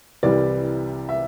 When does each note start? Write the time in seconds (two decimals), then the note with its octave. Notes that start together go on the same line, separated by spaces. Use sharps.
0.23 C2 C3 E3 G3 D5
1.09 E5